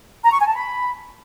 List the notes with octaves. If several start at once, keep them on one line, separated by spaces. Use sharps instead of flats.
A#5
C#6
G#5
A5
B5